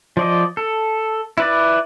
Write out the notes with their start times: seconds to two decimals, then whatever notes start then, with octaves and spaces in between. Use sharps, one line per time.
0.17 F3 D5 D#5
0.57 A4
1.38 E4 B4 D5